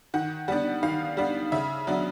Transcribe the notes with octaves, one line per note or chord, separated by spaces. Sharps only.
D#3 F#5
G3 B3 D4 F#5
D#3 F5
G3 B3 D4
C#3 E5
F#3 B3 D4